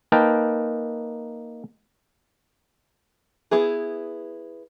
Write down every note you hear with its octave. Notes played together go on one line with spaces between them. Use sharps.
A#3 D#4 A#4 B4 G5 A5
B3 E4 G#4